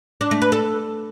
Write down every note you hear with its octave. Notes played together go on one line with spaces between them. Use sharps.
D4
A3
B4
A4